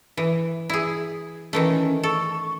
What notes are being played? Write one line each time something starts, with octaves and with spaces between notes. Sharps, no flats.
E3
E4 G#4
D#3 E3 A3 C#4
A4 C#6